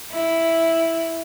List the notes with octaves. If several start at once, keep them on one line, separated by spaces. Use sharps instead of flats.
E4